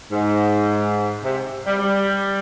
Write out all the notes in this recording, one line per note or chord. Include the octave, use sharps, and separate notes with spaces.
G#2
C3
G3
G3